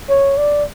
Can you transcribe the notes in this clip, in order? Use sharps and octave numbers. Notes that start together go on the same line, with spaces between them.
C#5
D5